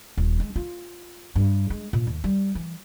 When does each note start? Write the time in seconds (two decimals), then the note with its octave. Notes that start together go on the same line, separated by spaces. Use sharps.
0.17 D#1
0.40 G#3
0.56 F4
1.35 G2
1.70 G#3
1.93 A#2
2.07 D#2
2.24 G3
2.55 E3